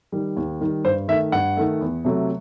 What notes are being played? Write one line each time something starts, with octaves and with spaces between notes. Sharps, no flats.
D#3 G3
D#2
D#3 G3
G2 C5
D#3 A3 E5
G2 F#5
D#3 A3
E2
C3 F#3 A3